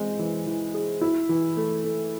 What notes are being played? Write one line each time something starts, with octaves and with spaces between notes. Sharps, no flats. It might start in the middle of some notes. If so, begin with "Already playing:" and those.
Already playing: E3 G#3 C4
E3
E3
G#4
E4
E3
A3
A3